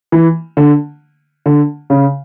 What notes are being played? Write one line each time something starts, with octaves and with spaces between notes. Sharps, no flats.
E3
D3
D3
C#3